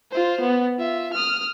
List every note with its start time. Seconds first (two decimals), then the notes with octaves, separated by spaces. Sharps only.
0.11 F4 C5
0.41 B3
0.79 F4 E5
1.14 D#6 F6